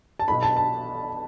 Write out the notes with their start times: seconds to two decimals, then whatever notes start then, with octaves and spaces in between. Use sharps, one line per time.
0.19 A5
0.28 B1 B2 B5
0.43 A5
0.57 A5